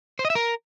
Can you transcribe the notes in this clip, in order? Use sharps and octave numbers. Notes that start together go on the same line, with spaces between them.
C5
D#5
E5
A#4